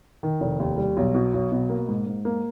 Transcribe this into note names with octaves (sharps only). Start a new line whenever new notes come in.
D#3
F1
D#2
G3
B1
B2
B1
B2
A#3
G#2
G#2
A#3